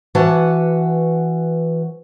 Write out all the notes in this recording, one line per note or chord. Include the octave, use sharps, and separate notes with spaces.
E3 F#4 B4 F#5 A5